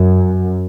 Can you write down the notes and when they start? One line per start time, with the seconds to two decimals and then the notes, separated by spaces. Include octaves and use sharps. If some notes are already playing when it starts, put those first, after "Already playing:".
Already playing: F#2